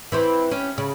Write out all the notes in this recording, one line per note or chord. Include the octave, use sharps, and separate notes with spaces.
E3 C4 C5
C#4 G4
C#3